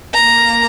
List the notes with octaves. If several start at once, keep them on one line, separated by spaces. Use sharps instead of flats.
A#3 A#5